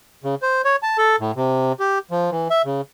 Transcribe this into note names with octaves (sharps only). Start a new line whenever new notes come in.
C#3
C5
C#5
A5
A4
A2
C3
G4
F3
E3
E5
C#3